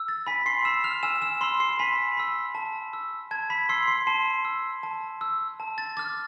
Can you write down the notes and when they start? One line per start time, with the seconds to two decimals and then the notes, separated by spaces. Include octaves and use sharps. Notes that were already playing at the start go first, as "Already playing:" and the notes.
Already playing: E6
0.08 A6
0.27 G#5 B5 B6
0.46 C6 C7
0.65 B5 E6 E7
0.84 F6 F7
1.03 G#5 E6 E7
1.22 E6 E7
1.41 B5 C6 E6 C7
1.60 C6 C7
1.79 G#5 B5 B6
2.17 B5 E6
2.55 A5
2.93 E6
3.31 A5 G#6
3.50 B5 B6
3.69 C6 E6 C7
3.87 C6 C7
4.07 A5 C6 C7
4.45 E6
4.83 A5
5.21 E6
5.60 A5
5.78 A6
5.97 D6 F6 A6